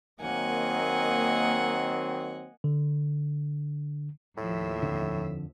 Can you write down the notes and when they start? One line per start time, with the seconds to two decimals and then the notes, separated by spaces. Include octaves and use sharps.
0.21 D#3 F#3 A#3 C4 D#5 F#5 G#5
2.64 D3
4.37 D#2 A2 F3 E5
4.83 F2 D3